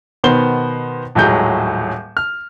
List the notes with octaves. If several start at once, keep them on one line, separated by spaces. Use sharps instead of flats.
B2 D#3 B3 C5 C6 G7
D#1 A2 F#3 G#3 G6
F6